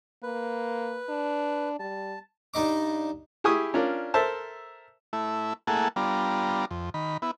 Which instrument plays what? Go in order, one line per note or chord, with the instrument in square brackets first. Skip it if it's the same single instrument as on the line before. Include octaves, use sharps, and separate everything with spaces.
[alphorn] A#3 [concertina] B4
[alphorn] D4
[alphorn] G3 [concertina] A5
[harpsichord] G2 D#4 D#5 D6
[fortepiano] E4 G4 G#4 G#5 C#6 D#6
C#4 D4 F4 A#4 D5
A4 A#4 C5 E5 A5
[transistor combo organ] A3 E4
A3 A#3 E4 G#4 A4 F#5
G3 B3 D4 F4 A#5
F2
D#3 B5
B3 E4